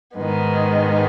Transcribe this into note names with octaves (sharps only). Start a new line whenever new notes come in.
G#2 D#3 G#3 B3